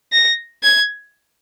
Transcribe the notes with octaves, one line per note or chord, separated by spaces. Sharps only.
A#6
G#6